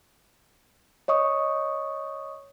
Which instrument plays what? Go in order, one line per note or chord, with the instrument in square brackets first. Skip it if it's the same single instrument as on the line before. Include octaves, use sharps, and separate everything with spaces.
[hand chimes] C#5 D#5 C#6 D#6